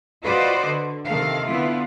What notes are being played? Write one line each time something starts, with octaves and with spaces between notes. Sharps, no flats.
F4 F#4 B4 C5 D5 D#5
D3
C3 D#3 A4 F5
D3 B3 E4 F4